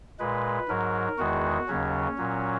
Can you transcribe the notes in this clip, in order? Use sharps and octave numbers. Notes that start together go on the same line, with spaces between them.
A#2 G#3 B4
G#2 F#3 A#4
E2 D#3 G#3 F#4
D#2 C#3 F#3 C#4
A#2 F#3